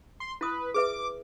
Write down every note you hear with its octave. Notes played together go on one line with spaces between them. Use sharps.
C6
E4 B4 D#6
G#4 B4 E5 D6